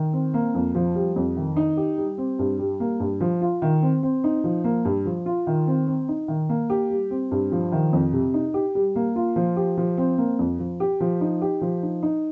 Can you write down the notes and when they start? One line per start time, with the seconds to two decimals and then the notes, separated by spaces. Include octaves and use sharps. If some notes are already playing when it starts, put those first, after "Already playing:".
Already playing: D#3
0.13 C4
0.34 A#3
0.54 F2
0.75 F3
0.95 G3
1.16 F2
1.37 D#3
1.56 D#4
1.77 G4
1.98 G3
2.18 C4
2.39 G2
2.59 G3
2.80 A#3
3.00 G2
3.21 F3
3.41 F4
3.62 D#3
3.82 C4
4.03 C4
4.24 D#4
4.44 F3
4.64 A#3
4.85 G2
5.06 F3
5.26 F4
5.47 D#3
5.67 C4
5.87 C4
6.08 D#4
6.28 D#3
6.49 A#3
6.70 G4
6.90 G3
7.11 C4
7.31 G2
7.52 F3
7.72 D#3
7.93 F2
8.13 C3
8.34 D#4
8.54 G4
8.75 G3
8.96 A#3
9.16 F4
9.36 F3
9.57 G4
9.77 F3
9.98 C4
10.18 A#3
10.39 F2
10.59 F3
10.80 G4
11.00 F3
11.21 D#4
11.42 G4
11.61 F3
11.83 D#4
12.03 D#4